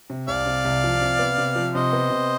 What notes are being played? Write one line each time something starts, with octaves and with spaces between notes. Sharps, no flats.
C3
C2 D5 F5
C3
C2
F3
C3
B3
C3
F3
C3 C5 D#5
B3
C3